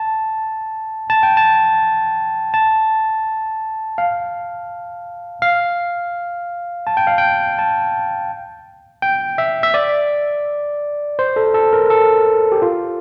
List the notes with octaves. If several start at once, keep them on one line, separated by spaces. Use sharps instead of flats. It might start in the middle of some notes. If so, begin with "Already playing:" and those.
Already playing: A5
A5
G5
A5
A5
F5
F5
A5
G5
F5
G5
A5
G5
E5
E5
D5
C5
A4
A4
A#4
A4
G4
F4